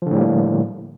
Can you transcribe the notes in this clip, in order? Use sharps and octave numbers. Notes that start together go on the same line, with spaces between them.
A2 D3 F3 G3 A#3